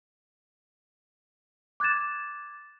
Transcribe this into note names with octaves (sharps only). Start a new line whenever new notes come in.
D6 F#6 G#6 A6 E7